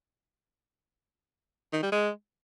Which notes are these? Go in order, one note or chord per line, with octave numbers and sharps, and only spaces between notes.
D#3
G3
G#3